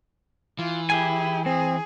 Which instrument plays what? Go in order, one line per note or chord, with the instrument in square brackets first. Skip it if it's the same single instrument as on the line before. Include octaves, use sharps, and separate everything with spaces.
[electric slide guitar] E3 [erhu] F4
[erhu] E4 [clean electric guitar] G4 G#4 G#5
[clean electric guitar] C4 [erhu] G#4